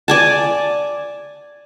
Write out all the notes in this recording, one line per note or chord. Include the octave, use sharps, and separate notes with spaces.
D5 G#5 A5